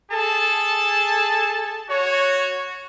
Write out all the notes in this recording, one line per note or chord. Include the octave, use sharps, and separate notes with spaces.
G#4 A4 A5
F#4 C#5